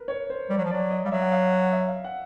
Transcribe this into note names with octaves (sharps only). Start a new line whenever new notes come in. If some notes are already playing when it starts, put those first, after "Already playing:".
Already playing: A#4 B4
C#5
C5
G3 C#5
F#3
F3
F#3 D5
D#5
G3 F5
F#3 E5
F#5
F5
F#5
E5
F5
F#5